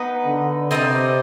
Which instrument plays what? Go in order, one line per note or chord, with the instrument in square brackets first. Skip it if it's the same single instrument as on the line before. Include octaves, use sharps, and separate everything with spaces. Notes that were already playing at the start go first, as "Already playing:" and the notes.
Already playing: [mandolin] B3 D#4 B4
[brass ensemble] D3
[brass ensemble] C3 [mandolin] C4 D#4 B4 D5